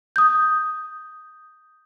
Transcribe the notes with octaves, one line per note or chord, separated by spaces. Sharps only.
D#6 G6